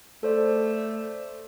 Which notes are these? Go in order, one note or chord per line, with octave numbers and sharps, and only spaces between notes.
A3 A4 C5 D5